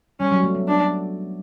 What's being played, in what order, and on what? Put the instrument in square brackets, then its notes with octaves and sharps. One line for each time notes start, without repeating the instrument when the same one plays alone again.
[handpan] G3 [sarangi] C#4
[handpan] F#3
A3
B3
[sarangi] D4